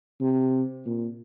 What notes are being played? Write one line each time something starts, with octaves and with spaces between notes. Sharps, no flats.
C3
A#2